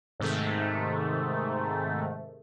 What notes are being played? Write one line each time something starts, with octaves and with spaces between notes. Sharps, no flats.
G#2 C3 D#3 A3